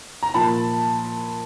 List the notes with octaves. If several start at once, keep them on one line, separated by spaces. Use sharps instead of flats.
A#5
A#2 F3 A5 B5